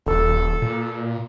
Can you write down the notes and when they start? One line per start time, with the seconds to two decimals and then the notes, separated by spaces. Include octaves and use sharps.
0.06 D#1 A4
0.62 A#2